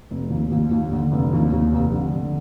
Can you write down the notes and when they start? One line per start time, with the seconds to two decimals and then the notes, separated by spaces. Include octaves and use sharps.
0.11 F1
0.30 D#2
0.52 D#2
0.72 D#2
0.91 D3
1.12 F1
1.33 D#2
1.52 D#2
1.72 F1
1.93 D3
2.14 D3